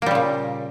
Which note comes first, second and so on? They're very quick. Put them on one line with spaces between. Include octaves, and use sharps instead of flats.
A#3 G3 C#3 A#2